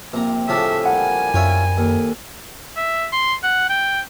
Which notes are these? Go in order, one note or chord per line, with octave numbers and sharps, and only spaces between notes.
A#1 C3 A#5
A2 C#3 F3 D4 E5
G3 A#3 F#5 G#5
F#2 F4 C#5 E5
D#2 A4
E5
C6
F#5
G5